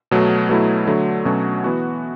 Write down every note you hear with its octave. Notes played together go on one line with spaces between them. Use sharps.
B2 F#3 A3
B2 F#3 A3 E4
D3 F#3 A3
B2 F#3 A3 C#4 F#4
E3 B3 F#4